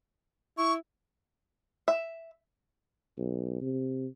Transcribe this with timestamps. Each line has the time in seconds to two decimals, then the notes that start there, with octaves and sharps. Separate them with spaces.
0.58 E4 C#6
1.88 E5
3.18 B1
3.61 C3